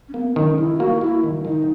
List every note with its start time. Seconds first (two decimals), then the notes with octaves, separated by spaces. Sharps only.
0.09 C#4
0.14 A#3 B3
0.36 D#3 C#4
0.58 D#3 E4
0.75 E4
0.79 A#3 F#4
1.01 A#3 E4
1.23 D#3
1.45 D#3 D#4